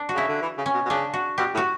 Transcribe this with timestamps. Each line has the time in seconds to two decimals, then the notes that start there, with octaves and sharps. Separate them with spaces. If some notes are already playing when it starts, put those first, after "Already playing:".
Already playing: D4
0.09 F#4
0.14 C#3 E4
0.28 D3
0.42 E3
0.58 C#3
0.66 C#4
0.74 B2
0.86 B2
0.89 C#3 D4
1.14 F#4
1.38 B2 G4
1.54 A2
1.57 F#4